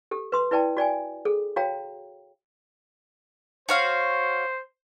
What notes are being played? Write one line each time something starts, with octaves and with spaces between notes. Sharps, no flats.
G4 A4
B4 C6 D#6
E4 B4 D5 G5 A5
F#4 D5 G5 G#5
G#4 A4
F#4 C#5 F5 G5 A#5
F#4 C5 C#5 F5